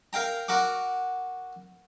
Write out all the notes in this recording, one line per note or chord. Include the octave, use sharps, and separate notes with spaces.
A#4 F5 G5 A#5
F#4 A#4 F#5 D6